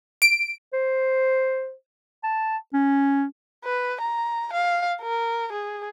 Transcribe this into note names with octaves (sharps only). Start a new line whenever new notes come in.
D7
C5
A5
C#4
B4
A#5
F5
A#4
G#4